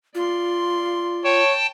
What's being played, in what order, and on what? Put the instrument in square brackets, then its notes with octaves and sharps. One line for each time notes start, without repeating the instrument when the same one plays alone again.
[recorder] F4 [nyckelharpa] D5 C6
[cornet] C#5 [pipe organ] G5 A5